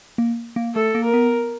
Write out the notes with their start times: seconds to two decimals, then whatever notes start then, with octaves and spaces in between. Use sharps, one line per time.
0.18 A#3
0.56 A#3
0.75 A3 A4
0.95 A#3
1.04 A#4
1.14 B3